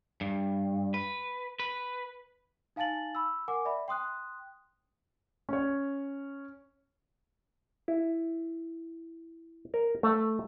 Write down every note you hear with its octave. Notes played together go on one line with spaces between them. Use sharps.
G2
B4
B4
D#4 F5 G#5 A5 A6 F#7
B5 E6
A#4 F#5 G#5 D6
D5 E5 B5
G5 C6 D#6 F#6
C#4 C#5
E4
A#4
A3